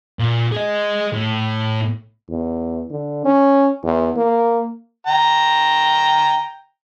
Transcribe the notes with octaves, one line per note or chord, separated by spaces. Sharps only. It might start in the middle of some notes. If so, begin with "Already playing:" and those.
A#2
G#4 D#5
A2
E2
D3
C#4
E2
A#3
G5 A#5